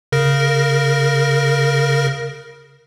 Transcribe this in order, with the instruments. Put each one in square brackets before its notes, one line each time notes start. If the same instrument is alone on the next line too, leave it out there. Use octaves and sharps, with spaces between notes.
[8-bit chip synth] C#3 A#4 A#6